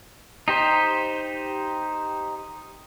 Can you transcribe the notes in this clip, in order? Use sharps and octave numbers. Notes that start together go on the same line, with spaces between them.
D#4 G4 C5